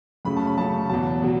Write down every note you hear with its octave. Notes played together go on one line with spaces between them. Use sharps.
F#2 C#3 A3 C#4 B5
A5
B5
F#2 C#3 A3 C#4 A5
E2 B2 F#3 A5
B2 F#3